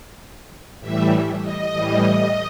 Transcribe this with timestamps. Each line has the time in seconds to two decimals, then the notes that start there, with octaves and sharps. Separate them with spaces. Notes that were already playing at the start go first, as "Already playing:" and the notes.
0.80 A2 E3 G3 E5
1.41 D#5
1.72 A2 E3 G3